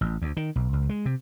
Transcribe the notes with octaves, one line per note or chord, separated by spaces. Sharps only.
A1
D2
D#3
B1
C#2
G#3
C3